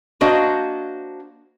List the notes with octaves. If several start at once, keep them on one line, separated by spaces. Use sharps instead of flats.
A#3 D4 F#4 C5 D#5 F5